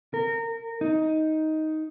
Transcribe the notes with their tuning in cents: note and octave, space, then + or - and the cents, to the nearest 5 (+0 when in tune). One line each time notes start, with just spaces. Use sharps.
A#4 -25
D#4 +10